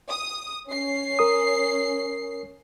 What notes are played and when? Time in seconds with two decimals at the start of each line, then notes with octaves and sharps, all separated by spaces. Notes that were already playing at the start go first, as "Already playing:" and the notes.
0.11 D#6
0.68 C#4 C7
1.19 A#4 D#6